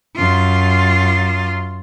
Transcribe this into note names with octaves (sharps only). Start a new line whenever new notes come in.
F#2 F4